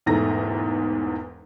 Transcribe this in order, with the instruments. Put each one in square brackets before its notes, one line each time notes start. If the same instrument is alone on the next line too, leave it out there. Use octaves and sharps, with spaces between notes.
[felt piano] E1 E2 G#2 A3 A#5 A#6